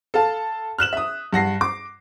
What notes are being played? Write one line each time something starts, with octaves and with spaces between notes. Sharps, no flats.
A4 F5 A5
F6 F#6 E7 F#7
E5 D#6
G2 F#5 A#6 C7
D6